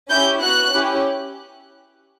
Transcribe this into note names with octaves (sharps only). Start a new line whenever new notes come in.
C#4 E4 G4 G6
B3 F#4 F#6
C#4 E4 G4